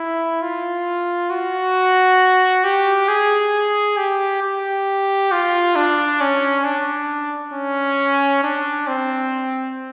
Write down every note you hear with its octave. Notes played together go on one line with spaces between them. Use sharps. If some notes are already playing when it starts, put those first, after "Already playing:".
Already playing: E4
F4
F#4
G4
G#4
G4
G4
F4
D4
C#4
D4
C#4
D4
C4